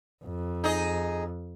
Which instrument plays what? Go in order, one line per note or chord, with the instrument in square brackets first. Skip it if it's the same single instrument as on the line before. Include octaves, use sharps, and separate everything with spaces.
[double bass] F2
[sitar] D#4 G#4 D#5